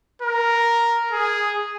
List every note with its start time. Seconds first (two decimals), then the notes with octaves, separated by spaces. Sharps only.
0.22 A#4
1.12 G#4